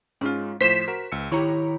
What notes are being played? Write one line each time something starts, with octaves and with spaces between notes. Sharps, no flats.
G#2 G#3 C#4 F4
A2 F3 C5 B6 E7
F#4 A#4
C#2 E6 C#7
D#3 E4 G4 C#5 A#5 C#6